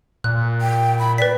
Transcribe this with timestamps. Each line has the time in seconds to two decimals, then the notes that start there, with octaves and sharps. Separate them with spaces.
0.24 A#2 F#6
0.62 G5
0.99 B5
1.18 B4 D5 B6